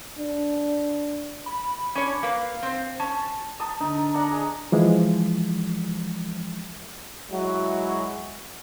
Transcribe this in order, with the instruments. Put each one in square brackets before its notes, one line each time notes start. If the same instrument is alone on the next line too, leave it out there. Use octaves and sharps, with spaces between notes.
[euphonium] D4
[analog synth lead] B5
[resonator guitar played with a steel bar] C#4 D4 C#5
[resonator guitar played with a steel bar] A#3 B4 [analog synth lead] F5
[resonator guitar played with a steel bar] C4 C5
[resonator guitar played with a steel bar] C#4 [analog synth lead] A5
[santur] A5 A#5 D#6
[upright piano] D3 [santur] D#4
[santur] D4 F#5 A#5
G#4 D#5
[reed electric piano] E3 F3 G#3
[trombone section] F#3 G#3 E4 F#4